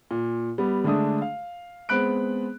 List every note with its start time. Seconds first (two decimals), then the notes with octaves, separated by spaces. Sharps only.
0.11 A#2
0.58 G3 B3
0.84 D3 G#3 A3 D4 D#6
1.22 F5
1.89 G#3 B3 C4 B5 F#6 D7